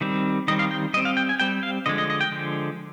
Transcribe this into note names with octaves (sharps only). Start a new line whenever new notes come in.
D#3 G3 C4
D#3 G3 C4 D#5
F5
G5
G3 C4 D#5
F5
G5
G#5
G3 C4 G5
F5
D3 F3 G#3 D#5
D#5
D#5
G5
D3 F3 G#3